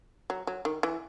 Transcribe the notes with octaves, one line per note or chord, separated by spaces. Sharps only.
F#3
F#3
D#3
E3